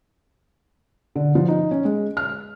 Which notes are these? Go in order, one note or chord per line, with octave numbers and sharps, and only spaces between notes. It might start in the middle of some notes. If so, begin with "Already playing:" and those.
D3
F3
D#4
C#4
G#3
F6